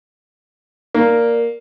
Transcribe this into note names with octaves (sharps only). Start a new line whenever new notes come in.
A#3 A#4 D5